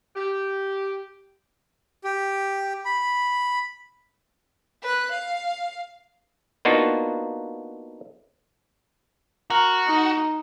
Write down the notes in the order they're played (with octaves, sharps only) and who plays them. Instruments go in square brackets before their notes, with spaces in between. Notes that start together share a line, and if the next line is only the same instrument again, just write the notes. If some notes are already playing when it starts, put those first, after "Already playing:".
[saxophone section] G4
[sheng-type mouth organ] G4
B5
[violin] B4 F#6
F5
[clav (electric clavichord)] A#3 B3 D4 D#4 F4 F#4
[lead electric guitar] F#4 [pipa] A#4
[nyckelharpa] D#4